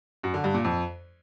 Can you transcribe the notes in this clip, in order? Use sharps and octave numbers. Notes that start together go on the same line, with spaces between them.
F#2
D3
G2
A#2
F2